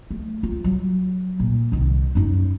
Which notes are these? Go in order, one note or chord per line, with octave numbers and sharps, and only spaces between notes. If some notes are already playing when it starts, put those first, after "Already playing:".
A3
F4
F#3
A#2
C2 D#3
F#2 D#4